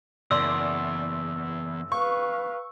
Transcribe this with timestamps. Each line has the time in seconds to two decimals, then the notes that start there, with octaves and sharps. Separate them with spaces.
0.31 F#1 E2 D5 C6 E6
1.92 B4 F5 C#6